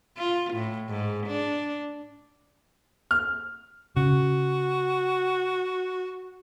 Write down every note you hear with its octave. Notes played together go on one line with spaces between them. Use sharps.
F4
A2
G#2
D4
F6
C#3 F#4